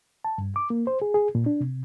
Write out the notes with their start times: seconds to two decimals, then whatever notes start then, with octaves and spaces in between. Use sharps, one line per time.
0.25 A5
0.38 G2
0.56 D6
0.70 A#3
0.87 C5
1.02 G#4
1.14 G#4
1.35 A#2
1.46 D4
1.61 C3